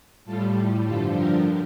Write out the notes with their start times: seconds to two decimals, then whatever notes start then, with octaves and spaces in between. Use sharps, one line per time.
0.25 A2 G3 F4 A4
0.84 G2 D3 F3 F4 A4
1.15 G4 A#4